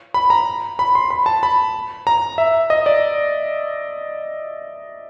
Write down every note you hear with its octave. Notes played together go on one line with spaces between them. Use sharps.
B5
A#5
B5
C6
B5
A5
B5
A#5
E5
D#5
D5